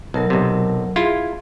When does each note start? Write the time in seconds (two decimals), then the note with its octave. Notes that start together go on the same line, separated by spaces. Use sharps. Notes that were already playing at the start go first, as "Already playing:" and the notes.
0.14 B1 F#3 A#4 A5
0.30 B1 C3
0.96 E4 F4 G#4